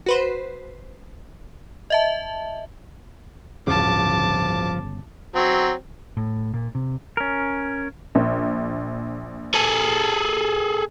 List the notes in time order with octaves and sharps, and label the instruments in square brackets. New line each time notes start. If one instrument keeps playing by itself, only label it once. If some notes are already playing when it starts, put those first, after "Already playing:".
[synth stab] F#4 B4 C5
[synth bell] D#5 E5 A5
[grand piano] D1 [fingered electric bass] G1 C#3 [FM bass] F3 [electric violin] A5 D6
[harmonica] F#3 C4
[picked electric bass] A2
A#2
C3
[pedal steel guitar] C#4 A#4
[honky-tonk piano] A#1
[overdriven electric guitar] G#4 A4